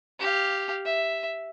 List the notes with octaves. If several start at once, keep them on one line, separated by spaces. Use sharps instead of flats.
G4 F5
E5